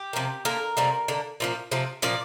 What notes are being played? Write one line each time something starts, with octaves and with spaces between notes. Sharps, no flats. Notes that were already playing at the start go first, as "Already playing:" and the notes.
Already playing: G4
C3 F3 A#3
D3 A#3 A#4
C3 G3 A#3
D3 A#3
A#2 F3 A#3
C3 F3 A#3
A#2 F3 A#3 D5